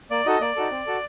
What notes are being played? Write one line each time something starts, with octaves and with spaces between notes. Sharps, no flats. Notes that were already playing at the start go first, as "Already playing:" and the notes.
A#3 D5
D#4 F#4 A4 D#5
A#3 D5
D#4 F#4 A4
C4
F#4 A4